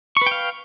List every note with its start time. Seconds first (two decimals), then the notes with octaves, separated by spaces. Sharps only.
0.17 C#6
0.22 B4
0.26 G5
0.31 F5